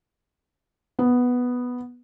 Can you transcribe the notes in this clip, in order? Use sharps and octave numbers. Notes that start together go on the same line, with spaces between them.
B3